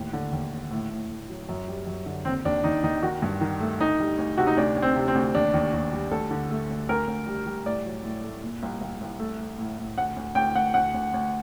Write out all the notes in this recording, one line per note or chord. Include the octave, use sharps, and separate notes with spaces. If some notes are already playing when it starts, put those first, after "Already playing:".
Already playing: D#2 A2
D3
D#2
D#2
A2
A2
A2
F#3
F#2
G3
F#2
D3
D#2 C4
D#2 D4
D#2 D#4
D#2 D#4
D#3 F#4
G2
D#3
A3
D2 D#4
G3
D2
C3 F#4
D#4
D2 D4
D2
C4
C3
C4
D2
D#2 D4
D#2
D#2
G3
D2 A4
D3
A3
D2
D2 A#4
D2
G3
G3
A2 D5
F#3
A2
A3
A#2
C2
C2
C2
A3
A3
A2
A2
D2 F#5
D2
D2 G5
D2 F#5
D2 F#5
D2
D2